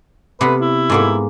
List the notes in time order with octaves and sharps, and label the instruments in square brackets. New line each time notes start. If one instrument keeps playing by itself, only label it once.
[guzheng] C3 B3 [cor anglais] B4
[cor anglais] E4
[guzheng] G#2 A#3 B3